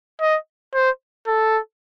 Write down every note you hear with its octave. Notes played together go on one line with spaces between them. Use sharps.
D#5
C5
A4